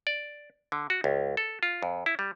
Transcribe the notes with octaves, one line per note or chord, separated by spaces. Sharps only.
D5
D3
F#4
C#2
A4
F4
F2
E4
G3